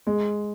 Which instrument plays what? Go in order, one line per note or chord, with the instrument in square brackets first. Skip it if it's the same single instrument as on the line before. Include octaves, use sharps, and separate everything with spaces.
[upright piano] G#3